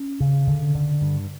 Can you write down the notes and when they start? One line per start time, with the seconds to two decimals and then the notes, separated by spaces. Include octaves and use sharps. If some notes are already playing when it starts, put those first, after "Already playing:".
Already playing: C#4
0.20 C#3
0.47 D3
0.75 D3
1.02 G2